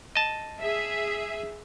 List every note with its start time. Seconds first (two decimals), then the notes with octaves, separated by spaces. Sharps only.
0.16 D#5 A5
0.61 G#4 E5